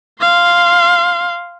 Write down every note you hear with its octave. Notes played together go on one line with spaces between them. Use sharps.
F5 C6